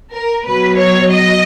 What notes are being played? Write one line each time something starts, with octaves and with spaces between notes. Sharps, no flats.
A#4
B2 F#3 B4
C#5
D#5